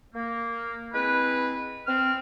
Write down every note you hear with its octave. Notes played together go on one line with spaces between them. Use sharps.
A#3
G#3 C4 E4 B4
C4 F6